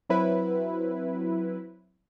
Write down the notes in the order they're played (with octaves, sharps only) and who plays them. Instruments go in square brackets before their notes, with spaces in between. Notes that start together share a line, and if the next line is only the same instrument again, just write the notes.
[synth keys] F#3 C4 E4 B4